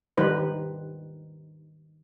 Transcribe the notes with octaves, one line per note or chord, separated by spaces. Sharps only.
D#3 G3 D#4 B4 C5